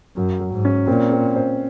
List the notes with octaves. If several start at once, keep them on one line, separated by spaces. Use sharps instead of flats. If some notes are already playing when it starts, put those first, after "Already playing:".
F#2 F#3
F#3
G#2
C#4
A#2 C4
C4
C5